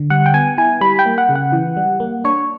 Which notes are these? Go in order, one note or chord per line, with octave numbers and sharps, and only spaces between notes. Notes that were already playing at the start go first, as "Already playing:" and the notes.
Already playing: D3
G3 F#5
G5
B3 G#5
E4 G#5
G3 B5
G5
A#3
F#5
C#3
F#5
E3
G3
A#3
D4 C#5